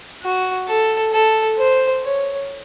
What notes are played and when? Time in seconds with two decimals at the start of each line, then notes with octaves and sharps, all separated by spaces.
0.22 F#4
0.67 A4
1.13 A4
1.58 C5
2.03 C#5